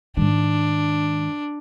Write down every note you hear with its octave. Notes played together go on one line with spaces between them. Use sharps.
G#2 D#3 D4